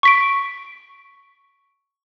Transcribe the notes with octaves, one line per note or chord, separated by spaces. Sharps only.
C#6 B6 D7